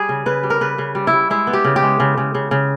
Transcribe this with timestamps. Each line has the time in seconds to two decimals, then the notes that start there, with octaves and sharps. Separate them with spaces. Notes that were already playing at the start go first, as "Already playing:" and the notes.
Already playing: G3 G#4
0.09 C#3
0.26 C#3 B4
0.43 G3
0.50 A#4
0.61 C#3 B4
0.78 C#3
0.95 G3
1.07 E4
1.13 G3
1.30 G#3 E4
1.47 B3
1.53 G4
1.65 C#3
1.76 G4
1.82 G#3
2.00 C#3
2.18 C#3
2.35 C#3
2.51 C#3